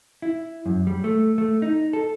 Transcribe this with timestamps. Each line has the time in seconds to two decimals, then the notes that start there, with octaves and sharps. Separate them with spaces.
0.22 E4
0.66 F#2
0.87 G3
1.04 A3
1.38 A3
1.62 D#4
1.93 A4